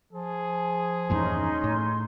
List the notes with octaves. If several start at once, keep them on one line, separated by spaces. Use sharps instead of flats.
F3 G#4
E2 G2 A#2 C#4 D#4 C6
A2